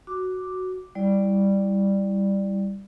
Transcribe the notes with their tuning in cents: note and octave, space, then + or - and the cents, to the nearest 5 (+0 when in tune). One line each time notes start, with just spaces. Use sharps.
F#4 +0 D6 +0
G3 +0 E4 +0 D5 +0